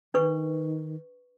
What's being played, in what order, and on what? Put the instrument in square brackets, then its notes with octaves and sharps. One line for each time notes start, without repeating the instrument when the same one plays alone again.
[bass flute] D#3 [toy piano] D4 B4 C#6